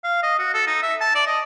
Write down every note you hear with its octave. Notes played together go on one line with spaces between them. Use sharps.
F5
D#5
F#4
A4
D#4
E5
A5
D5
D#5